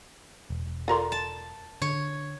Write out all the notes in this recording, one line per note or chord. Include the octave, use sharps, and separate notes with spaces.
E1
F4 A4 A#4 D5 A#5 C6
A5
D3 C#5